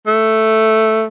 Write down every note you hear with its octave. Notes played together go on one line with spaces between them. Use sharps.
A3